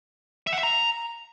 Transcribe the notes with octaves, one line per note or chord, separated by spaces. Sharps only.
E5
F#5
E5
A#5